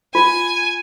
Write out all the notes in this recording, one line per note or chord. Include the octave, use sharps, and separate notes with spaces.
F4 G#5